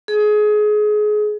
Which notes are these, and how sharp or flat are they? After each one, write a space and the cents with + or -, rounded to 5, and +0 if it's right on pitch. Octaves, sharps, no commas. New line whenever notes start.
G#4 +25